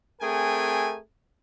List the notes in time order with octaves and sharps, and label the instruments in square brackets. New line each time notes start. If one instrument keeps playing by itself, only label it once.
[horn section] A3 C4 G#4 A#4 G5 G#5